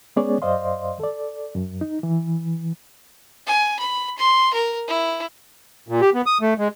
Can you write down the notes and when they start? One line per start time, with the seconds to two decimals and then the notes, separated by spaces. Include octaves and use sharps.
0.16 G#3 B3 C#4 G#4 C#5 D5
0.42 F#2 C5 D5 D#5 F5 C6
1.00 A4 D5
1.55 F#2
1.81 D#4
2.03 E3
3.47 G#5
3.79 B5
4.18 C6
4.54 A#4
4.88 E4
5.88 A#2
6.01 G4
6.14 B3
6.26 D#6
6.41 A3
6.58 G#3